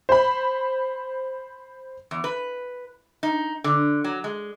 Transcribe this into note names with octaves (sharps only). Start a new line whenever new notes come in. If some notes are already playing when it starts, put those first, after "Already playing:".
C5 B5
E2
B4
D#4
D3
F#3
G#3